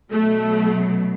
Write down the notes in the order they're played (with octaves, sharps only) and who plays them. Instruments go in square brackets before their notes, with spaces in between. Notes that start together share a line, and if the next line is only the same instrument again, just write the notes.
[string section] B2 F#3 A3